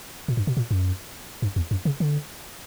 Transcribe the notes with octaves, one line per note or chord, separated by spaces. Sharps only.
A#2
G2
B2
A#2
F#2
G2
E2
F#2
C#3
D3